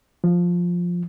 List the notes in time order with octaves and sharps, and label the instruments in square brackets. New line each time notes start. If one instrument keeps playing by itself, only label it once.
[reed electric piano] F3